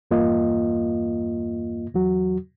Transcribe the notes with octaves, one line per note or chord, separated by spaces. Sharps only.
E2 G2 A#3 F4 D#5
E2 F#3 F#4